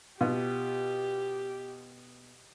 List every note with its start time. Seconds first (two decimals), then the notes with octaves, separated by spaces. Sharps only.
0.21 B2 F4 G4